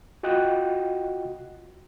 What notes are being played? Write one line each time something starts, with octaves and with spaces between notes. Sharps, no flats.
F4 F#4 D#5 F#5 G5 F#6